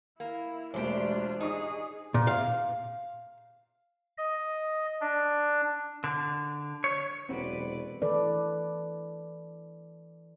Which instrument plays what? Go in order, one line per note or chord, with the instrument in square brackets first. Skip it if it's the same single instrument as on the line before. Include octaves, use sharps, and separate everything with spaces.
[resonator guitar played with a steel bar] A#3 [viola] E4
[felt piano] E1 A3 [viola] D4 F4 [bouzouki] G4 C5 D5
[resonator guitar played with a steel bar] D#4 [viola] G#4 [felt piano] D#5 C#6 D#6
[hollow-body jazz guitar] A#2
F5
[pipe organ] D#5
D4
[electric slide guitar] D3
C#5
[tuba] E1 [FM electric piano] C3 F#3 [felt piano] C4 [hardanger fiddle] B4 D5
[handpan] E3 A4 B4 D5